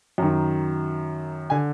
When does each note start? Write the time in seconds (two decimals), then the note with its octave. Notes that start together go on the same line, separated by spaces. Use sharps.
0.18 F#2 D#3
1.50 D3 G#5